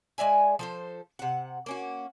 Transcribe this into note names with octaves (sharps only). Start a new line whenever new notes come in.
G#3 D5 E5 G#5
F3 A4 C5
C3 F#5
A#3 C#4 F#4